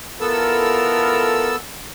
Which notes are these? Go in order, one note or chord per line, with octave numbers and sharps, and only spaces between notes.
B3 E4 F4 A4 A#4 E6